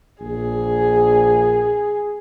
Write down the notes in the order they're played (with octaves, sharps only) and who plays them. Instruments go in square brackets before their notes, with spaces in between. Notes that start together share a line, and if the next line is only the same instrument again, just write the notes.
[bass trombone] A#1 [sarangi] G#4